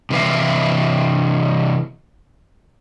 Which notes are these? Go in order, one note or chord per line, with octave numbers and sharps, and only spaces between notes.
C3 E3 E4 B4 F5